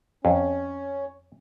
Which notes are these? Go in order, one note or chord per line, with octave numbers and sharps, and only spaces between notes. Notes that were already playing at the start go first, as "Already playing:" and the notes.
F2 C#4